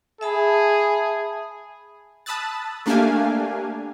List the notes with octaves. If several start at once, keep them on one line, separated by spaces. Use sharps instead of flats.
G#4 E5 A5 B5
A5 B5 D#6 E6 F#6 A6
A3 A#3 D4 G4 F5 G#5